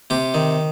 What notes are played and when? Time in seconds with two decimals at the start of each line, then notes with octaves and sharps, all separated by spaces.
0.10 C3 G4
0.34 D#3